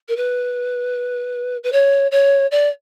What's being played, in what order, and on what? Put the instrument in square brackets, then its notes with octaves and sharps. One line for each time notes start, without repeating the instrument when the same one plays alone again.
[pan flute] A#4
B4
B4
C#5
C#5
D5